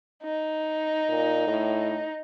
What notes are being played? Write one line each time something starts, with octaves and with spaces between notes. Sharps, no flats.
D#4
A#2
A2